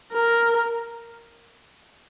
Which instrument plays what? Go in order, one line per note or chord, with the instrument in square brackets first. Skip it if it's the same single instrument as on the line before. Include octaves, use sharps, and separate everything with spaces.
[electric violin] A#4